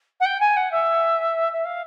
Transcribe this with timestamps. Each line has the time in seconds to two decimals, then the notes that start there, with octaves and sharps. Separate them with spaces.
0.20 F#5
0.25 G5
0.40 G#5
0.56 F#5
0.71 E5
1.52 E5
1.65 F5